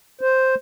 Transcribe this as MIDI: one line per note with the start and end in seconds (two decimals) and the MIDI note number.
0.21 0.55 72